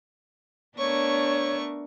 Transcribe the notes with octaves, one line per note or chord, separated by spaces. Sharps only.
A3 B3 D4 A#4 C#5 C#6